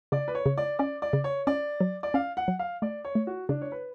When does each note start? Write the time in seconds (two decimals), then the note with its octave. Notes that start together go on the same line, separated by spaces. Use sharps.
0.12 C#3 D5
0.28 B4
0.35 C#5
0.46 C#3
0.58 D5
0.79 C#4 D5
1.02 D5
1.13 C#3
1.24 C#5
1.47 C#4 D5
1.81 F#3
2.03 D5
2.14 C#4 F5
2.37 F#5
2.48 F#3
2.59 F5
2.82 A3 D5
3.05 C#5
3.15 A3
3.27 F#4
3.49 C#3 D4
3.61 C#5
3.72 B4